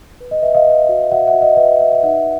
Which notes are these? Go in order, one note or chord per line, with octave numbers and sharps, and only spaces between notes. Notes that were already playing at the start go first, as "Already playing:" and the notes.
B4
D#5
B4 E5
D#5 F5
B4
F#4
F#4 E5 F#5
E5 F#5
F#4
D#5
B4 E5
D#5
B4 E5
E5
D#4 E5 F#5